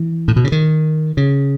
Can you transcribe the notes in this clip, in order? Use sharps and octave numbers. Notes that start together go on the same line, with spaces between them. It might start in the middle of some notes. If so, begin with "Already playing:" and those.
Already playing: E3
A2
B2
C#3
D#3
C#3